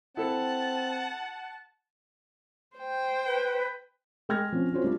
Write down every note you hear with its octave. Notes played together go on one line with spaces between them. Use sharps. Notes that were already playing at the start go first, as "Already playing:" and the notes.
C4 E4 A4 F#5 A5
C5 G5
B4
G#3 G5 F6 G#6 A#6
F3 C4 C#4
C4 C#4 F4 F#4 C5 C#5
G3 A3 D4 F4